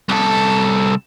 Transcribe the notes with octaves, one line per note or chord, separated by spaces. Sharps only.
C2 A4